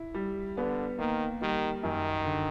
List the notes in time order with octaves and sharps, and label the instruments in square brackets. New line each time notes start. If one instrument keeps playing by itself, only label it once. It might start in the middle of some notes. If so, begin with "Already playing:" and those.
Already playing: [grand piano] E4
G3
[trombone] D3 [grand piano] B3
[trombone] D#3 [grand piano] A#3
[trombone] D#3 [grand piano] G3
[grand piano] F#2 [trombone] D#3
[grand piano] D3